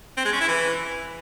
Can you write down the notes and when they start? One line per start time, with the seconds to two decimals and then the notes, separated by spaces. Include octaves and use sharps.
0.17 C4
0.25 G#3
0.33 C#4
0.41 E4
0.48 E3